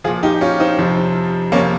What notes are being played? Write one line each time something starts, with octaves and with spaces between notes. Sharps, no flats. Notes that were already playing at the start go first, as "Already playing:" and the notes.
A#2 F3 F4 G#4
D#4 G4
C#4 F4
C4 D#4
F2 C3 F3
F2 C3 F3 A#3 C#4